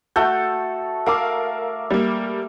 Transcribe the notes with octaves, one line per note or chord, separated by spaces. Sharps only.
A3 F#4 A4 G6
A#4 E5 F5 D6
G3 A#3